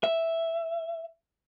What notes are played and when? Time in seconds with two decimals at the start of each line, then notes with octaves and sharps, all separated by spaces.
0.04 E5